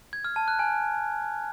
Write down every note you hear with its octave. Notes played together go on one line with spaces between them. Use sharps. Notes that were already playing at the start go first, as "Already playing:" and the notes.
G#6
F6
A5
F#6
G#5